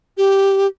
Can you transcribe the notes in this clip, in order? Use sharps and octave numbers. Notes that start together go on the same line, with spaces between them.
G4